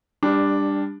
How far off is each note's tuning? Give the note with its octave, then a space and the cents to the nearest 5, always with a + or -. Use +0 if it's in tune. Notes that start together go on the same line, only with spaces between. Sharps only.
G3 +20 D4 +0